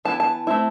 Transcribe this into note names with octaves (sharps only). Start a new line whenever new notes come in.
E3 B3 E4 A5
A5
A3 C4 E4